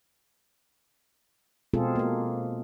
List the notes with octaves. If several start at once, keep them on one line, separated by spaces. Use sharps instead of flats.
B2 G#3 C4 F4 G#4 A4
A#3 A4